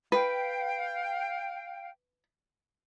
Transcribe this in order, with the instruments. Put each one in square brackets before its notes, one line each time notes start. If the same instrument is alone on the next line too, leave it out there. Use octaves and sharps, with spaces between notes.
[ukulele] B4 [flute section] F5 G5